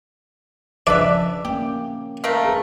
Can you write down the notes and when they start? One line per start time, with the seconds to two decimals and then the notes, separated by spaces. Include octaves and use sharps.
0.87 C#3 F3 D4 B4 D5 E5
1.45 A#3 C#4 G4
2.24 A3 A#4 F5
2.45 G#4 B4